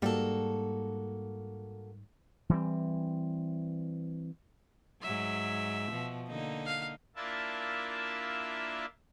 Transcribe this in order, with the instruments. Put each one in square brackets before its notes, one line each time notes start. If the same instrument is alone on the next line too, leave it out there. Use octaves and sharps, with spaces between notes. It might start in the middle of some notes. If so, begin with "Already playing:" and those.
[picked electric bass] G#2 G3 [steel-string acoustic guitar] A#3 F#4 A4
[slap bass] E3 G3 C4
[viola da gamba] G#2 F#3 [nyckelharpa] E5
[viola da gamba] B2 F3
D3 A#3 D#4
[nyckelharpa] F5
[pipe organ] A#3 D4 E4 F4 E5 A5